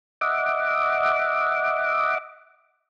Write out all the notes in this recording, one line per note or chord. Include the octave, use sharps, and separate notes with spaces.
D#5 E5 F#5 D6